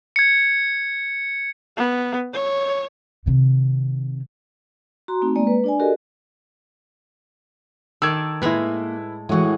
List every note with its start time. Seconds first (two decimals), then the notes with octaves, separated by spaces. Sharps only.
0.16 G#6 C#7
1.77 B3
2.33 C#5
3.26 C3 D#3
5.08 F#4 A#5 C6
5.22 A3 C4 D#4
5.36 G#3 A#3 D5
5.47 B4
5.64 D4 D5 G#5
5.80 F#4 G4 A4 A#4 D5 D#5
8.02 D#3 A4 D5 E6 G#6
8.42 A2 G#3 A#3 E4 B4
9.29 A2 E3 G#3 F#4 F#5